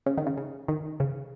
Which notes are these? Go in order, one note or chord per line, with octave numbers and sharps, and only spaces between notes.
C#3
D#3
C#3
C#3
D#3
C#3